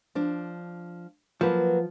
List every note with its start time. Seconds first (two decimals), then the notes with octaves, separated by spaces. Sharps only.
0.15 F3 D4
1.41 F3 F#3 A#3 B4